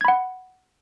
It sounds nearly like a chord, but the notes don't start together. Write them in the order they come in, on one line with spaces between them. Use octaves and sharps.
G#6 B5 F#5